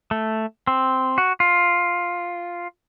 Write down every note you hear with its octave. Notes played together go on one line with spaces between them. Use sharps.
A3
C4
F#4
F4